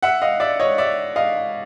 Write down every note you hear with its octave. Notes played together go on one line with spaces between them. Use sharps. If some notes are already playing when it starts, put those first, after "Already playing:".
E5 F#5
D#5 F5
D5 E5
C#5 D#5
D5 E5
D#5 F5